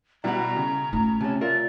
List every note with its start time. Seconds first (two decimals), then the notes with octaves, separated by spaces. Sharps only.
0.24 B2 G3 E4 F#5 A#5
0.56 C#3
0.93 A3 F4 A#5
1.21 C3 C#4 A5
1.41 F4 A#4 D5 E5